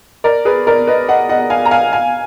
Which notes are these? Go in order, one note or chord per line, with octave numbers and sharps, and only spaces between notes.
A#4 D5
G#4 B4
A#4 D5
B4 D#5
D#5 F#5
D#5 F#5
F5 G#5
A#5
F5 G#5
F5 G#5